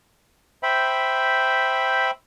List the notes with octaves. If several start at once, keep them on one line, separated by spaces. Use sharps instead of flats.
C5 E5 G5 B5